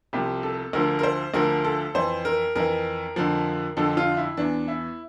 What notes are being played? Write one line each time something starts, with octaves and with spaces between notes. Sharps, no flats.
C2 C3 F3 G4
A4
D2 D3 F3 A#4
A#4
C5
D2 D3 F3 A#4
A4
F2 E3 C5
A#4
F2 E3 A#4
F2 D3 F3
F2 D3 F3 A4
F4
E4
E2 E3 D4
E4